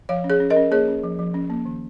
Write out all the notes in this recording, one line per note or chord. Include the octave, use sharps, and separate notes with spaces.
F3 C#5 F5
C#4
G#4 C#5
C#4
A#4 D#5
C#4
A#3 G#4 C#5
C#4
F3
F3
C#4
A#3
D#3